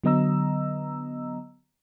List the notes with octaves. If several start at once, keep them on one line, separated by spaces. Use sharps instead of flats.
D3 F#3 B3 D#5 A#5 E6